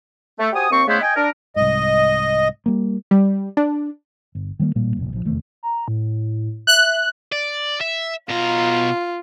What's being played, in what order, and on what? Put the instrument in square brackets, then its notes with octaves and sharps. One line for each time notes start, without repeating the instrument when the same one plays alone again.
[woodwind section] A3
F#4 G4 C5 G#5 D#6
D#2 C4 C#6
C#3 G#3 A3 B3 E4 C5
D#5 G5 G#5
D4 A#4
[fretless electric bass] C2 G#2 [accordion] D#5
[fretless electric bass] G3 A#3
[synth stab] G3
D4
[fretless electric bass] G1
D#3 G3 A3 A#3
A1 A#2 G3 A#3
F1 A#1
A#1 F3
F1 E2 D#3 A3
[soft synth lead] A#5
A2
[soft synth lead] E5 [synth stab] F#6
[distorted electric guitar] D5
E5
[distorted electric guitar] B2 A#5 [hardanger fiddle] F4